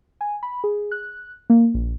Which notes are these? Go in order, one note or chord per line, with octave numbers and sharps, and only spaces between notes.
G#5
B5
G#4
F#6
A#3
A#1